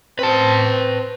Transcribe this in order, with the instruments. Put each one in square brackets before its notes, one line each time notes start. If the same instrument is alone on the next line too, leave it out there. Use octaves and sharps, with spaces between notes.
[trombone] C4 [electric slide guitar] B4 A5